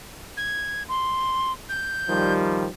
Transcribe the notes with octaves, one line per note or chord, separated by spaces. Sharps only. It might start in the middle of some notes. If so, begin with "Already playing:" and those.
G#6
C6
G6
D#3 F3 G3